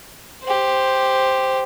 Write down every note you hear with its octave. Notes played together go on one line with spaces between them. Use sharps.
G4 C5